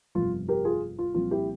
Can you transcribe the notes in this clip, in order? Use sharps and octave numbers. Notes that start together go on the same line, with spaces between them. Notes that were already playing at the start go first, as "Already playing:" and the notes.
G1 F2 C3 F4
G4 A#4
F4 G#4
F4
C2 A#2 F3 C4 F4
E4 G4